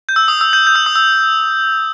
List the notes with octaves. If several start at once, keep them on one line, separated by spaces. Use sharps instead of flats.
G6
E6
D#6
E6
G6
G6
E6
D#6
E6